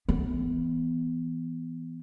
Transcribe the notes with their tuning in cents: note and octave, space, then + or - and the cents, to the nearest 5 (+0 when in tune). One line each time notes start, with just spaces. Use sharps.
E3 +0 B3 +10